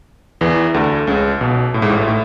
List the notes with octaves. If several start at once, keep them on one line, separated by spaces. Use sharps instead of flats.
E2 E3
D2 D3
C#2 C#3
B1 B2
A2
G#2
A1 A2
A2